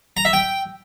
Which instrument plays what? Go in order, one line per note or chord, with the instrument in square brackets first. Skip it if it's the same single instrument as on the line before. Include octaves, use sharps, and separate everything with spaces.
[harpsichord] A#5
E5
G5